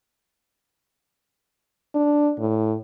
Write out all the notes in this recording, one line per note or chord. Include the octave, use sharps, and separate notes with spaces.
D4
A2